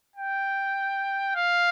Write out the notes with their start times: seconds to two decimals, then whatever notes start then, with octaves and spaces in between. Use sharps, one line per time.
0.16 G5
1.35 F5